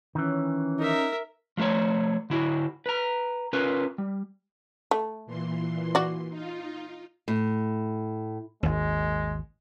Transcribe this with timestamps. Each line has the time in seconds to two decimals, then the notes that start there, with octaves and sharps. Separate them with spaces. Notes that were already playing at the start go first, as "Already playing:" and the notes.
0.15 D#3 E3 C#4
0.79 D#4 A#4 E5
1.57 F3 F#3 A3 C5 C#5
2.30 D3 E4 F#4
2.86 B4 A#5
3.53 C#4 F4 A#4 B4
3.98 G3
4.91 A3
5.26 A#2 E3 C6
5.95 F#4 D5
6.30 D#4 F4
7.28 A2
8.63 G#1 D#2 G#3